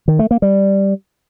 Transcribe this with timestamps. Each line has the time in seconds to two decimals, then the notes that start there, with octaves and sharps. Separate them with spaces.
0.08 D#3
0.19 A3
0.31 A#3
0.42 G3